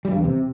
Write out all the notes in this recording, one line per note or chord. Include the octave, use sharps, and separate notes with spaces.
G3
G2
E2
C3